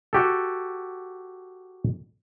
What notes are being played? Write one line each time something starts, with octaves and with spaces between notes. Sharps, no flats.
F#4 G4 A4